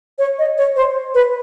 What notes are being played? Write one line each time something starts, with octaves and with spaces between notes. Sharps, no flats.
C#5
D#5
C#5
C5
B4